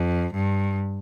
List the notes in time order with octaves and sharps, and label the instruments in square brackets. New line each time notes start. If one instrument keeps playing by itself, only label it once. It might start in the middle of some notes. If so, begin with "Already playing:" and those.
Already playing: [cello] F2
G2